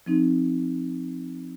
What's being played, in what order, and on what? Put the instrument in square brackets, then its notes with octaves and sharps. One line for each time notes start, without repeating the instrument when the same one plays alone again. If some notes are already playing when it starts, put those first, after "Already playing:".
[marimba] F3 C4 D#4